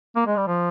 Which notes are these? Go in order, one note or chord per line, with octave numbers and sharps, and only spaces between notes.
A#3
G#3
G3
F3